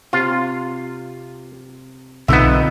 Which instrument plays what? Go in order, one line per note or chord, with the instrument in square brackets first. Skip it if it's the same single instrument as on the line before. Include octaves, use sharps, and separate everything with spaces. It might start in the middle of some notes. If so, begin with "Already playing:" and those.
[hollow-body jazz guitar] C3 [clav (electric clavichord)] F4
[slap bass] B1 D3 [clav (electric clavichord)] B3 E5 [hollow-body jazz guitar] C4 D#4 F4